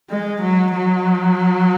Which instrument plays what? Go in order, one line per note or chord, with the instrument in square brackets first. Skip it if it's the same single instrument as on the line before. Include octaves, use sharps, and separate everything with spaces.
[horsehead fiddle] G#3
F#3
F#3